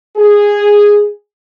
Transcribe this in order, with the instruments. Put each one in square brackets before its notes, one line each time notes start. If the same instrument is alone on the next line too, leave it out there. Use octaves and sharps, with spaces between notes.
[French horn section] G#4